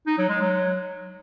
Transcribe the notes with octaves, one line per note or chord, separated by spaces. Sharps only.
D#4
F#3
G#3
F#3